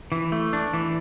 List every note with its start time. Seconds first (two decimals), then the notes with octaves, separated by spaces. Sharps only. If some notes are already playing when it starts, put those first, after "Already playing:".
0.12 E3
0.32 A3
0.53 D4
0.73 E3